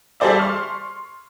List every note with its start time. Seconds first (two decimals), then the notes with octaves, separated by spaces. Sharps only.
0.20 G3 G#4 A4 C5 D5 E5
0.39 C6 C#6 F6